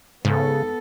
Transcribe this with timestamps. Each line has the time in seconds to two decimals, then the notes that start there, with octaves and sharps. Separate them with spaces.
0.25 G#2 C#3 B3 A4